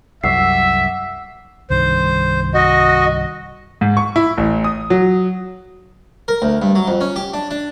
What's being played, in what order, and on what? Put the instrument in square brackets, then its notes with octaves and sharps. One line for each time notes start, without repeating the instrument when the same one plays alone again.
[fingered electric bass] C2 F#2 [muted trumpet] E5 [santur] F#5 C#6 D6 [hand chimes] E6 C7
[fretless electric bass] C2 G2 D#3 [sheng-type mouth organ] C5
[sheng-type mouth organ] F#4 [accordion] D#5
[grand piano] G#2
C#6
E4
A1
D#6
F#3
[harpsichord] A#4
D2
G2
F#3
F2
C#4
G4
D4
D4